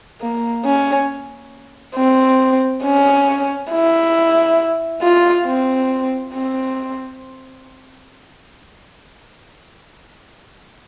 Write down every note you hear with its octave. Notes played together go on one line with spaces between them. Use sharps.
A#3
C#4
C4
C#4
E4
F4
C4
C4